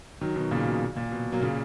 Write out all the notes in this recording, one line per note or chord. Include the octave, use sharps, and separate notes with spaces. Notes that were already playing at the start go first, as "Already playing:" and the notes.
D#3 F#3
B2 D#3
A#2 C#3
B2
A#2
B2
F#3 A#3
A#2 C#3